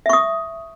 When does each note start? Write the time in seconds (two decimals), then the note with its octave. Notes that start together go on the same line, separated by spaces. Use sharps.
0.06 E5
0.09 C#6
0.13 D#6